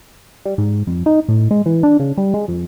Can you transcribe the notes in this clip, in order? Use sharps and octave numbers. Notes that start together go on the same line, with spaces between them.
G3
G#2
F2
D#4
A2
G#3
E3
D4
C#3
G3
G#3
F2